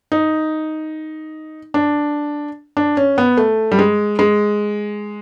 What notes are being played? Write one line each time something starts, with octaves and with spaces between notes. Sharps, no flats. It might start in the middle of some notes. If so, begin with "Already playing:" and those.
D#4
D4
D4
C#4
B3
A3
G3
G#3
G#3